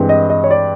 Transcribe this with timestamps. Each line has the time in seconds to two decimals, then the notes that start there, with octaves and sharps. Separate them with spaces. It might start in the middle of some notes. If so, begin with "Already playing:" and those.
Already playing: G2 E3 G#3 C4
0.09 D#5
0.30 D#5
0.44 C#5
0.51 D5